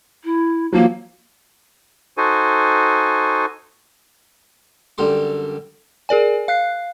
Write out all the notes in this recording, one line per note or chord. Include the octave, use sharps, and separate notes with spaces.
E4
F3 F#3 A#3
D#4 F#4 A4 C5 G#5
F#2 D3 G3 A4 C6
G#4 A#4 D5 G#5
F5 F#6 C7